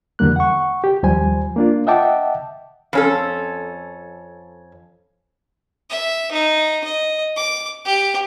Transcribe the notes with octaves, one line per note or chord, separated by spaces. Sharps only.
E2 D3 G3 A#3 F#6
F#5 C#6
G4
D#2 F3 G3 C5 G#5
A#3 D4 F4
D#5 E5 F#5 G5 A5 D6
F2 C#4 A4
E5
D#4
D#5
D6
G4